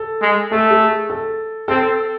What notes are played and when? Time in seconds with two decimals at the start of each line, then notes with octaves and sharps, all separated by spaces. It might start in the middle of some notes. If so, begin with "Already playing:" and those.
Already playing: A4
0.22 G#3
0.51 A3 A4
0.71 G#4
1.10 A4
1.68 C4 A4